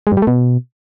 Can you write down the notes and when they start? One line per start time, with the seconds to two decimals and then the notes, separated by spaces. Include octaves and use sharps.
0.07 G#3
0.12 G2
0.17 G3
0.22 A3
0.27 B2